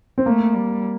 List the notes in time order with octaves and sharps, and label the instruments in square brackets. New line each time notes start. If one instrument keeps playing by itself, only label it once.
[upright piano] C4
[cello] A3 [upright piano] A#3
[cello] G3